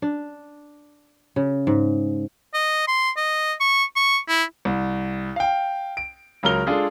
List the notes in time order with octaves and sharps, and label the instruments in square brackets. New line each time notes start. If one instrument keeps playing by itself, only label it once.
[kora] D4
C#3
G#2
[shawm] D#5
C6
D#5
C#6
C#6
E4
[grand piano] C2
F5 G5
D7
C#2 F#3 A#4 F6 G7
G#3 D4 F4 G#4 A4